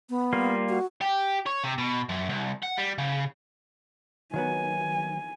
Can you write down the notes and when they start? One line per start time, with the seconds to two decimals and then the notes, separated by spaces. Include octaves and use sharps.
0.10 B3
0.33 G3 A#3 F4
0.69 F#4
1.01 G4
1.47 C#5
1.64 C3
1.78 B2
2.09 F#2
2.30 C2
2.63 F#5
2.78 G3
2.98 C#3
4.34 D#3 F#3 B3 G#5